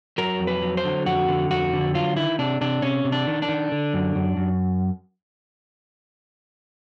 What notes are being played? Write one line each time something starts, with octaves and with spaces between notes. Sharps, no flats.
F#3 A#4
F2
B4
F#3
C5
D3
F2 F#4
D3
F2 F#4
D3
F#3 F4
D#3 E4
C3 D4
C3 D4
C3 C#4
C3
D4
D#3
D4
D#3
D3
F#2
F#2
F#2